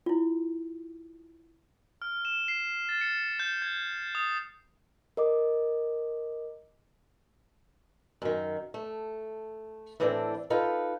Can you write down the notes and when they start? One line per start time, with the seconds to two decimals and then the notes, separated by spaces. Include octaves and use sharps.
0.06 E4 F4
2.02 F6
2.25 E7
2.48 C7
2.89 A6
3.01 C#7
3.39 G6
3.62 G#6
4.15 D#6
5.17 A#4 D#5 D6
8.22 F#2 D#3
8.74 A3
10.00 A2 E3 B3 C4 D4 A4
10.50 D#4 F4 A4 B4